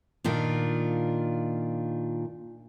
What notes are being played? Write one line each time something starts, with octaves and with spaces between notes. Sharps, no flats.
A#2 D#3 D4 F4